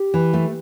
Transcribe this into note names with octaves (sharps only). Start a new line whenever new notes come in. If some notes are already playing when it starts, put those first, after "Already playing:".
Already playing: G4
E3
A3